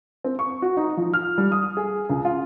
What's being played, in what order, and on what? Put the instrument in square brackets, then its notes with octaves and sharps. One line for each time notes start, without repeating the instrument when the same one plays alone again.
[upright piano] C4
C#6
F#4
D#4
F3
F6
G3
D#6
G#4
C#2
F4